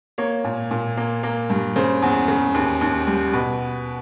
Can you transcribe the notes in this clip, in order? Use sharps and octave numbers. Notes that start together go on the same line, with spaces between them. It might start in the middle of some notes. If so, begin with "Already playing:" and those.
A#3 C#5
A#2
A#2
A#3
A#3
G2
C#3 C5
E2
C#3
D#2
D#2
G3
B2 B4